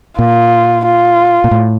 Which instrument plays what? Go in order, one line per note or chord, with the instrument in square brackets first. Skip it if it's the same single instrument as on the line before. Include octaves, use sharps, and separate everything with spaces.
[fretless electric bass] A#2 [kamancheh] F4
[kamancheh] F4
[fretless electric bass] A#2
A2